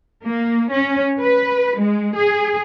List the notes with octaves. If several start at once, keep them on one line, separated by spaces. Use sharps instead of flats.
A#3
C#4
B4
G#3
G#4